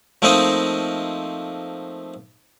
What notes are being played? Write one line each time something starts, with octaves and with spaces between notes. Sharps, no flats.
F3 A3 A#3 C4 D#4 D#5